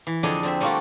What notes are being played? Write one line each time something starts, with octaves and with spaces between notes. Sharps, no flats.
E3
F2 D3 D4 G#4 D#5
D3 C4 E5
G3 A3 A#3 D4 F4 F#4